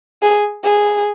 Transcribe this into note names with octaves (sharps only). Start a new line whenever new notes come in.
G#4
G#4